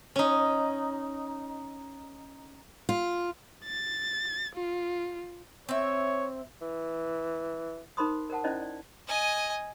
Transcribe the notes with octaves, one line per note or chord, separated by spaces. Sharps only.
C#4 D#4
F4
A6
F4
C4 C#5 E5
E3
D#4 A#4 C5 B5 C6 D#6
A#4 C5 F#5 A5
C#4 E4 C5 D5 D#5
D5
D#5 G#5